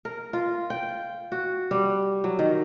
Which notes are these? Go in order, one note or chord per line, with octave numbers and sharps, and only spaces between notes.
A#4
F4
G5
F#4
G3
F#3
D#3